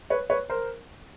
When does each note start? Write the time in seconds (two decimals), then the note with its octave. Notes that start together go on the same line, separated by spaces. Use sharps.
0.10 B4 C#5
0.30 B4 C#5
0.50 A#4 C5